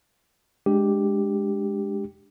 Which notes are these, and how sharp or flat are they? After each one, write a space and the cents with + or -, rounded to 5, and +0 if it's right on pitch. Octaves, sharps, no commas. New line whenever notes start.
G#3 +0 D4 +5 G4 +0